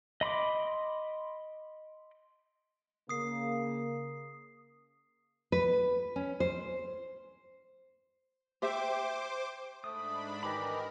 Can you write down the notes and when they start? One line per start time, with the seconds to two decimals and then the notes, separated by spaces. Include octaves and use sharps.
0.21 D#5 B5 C6 D6
3.09 C#3 A#3 D#6 C7
5.52 B4
6.16 C#4
6.40 C5
8.62 G4 C5 E5 D6
9.84 G#2 A3 D4 B5 D#6
10.43 D#3 E3 G4 A#4 D#5 B5